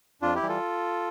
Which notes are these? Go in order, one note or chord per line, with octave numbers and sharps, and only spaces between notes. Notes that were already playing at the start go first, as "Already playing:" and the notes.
F2 D4 F4
E4 G4
E3 G3
F4 A4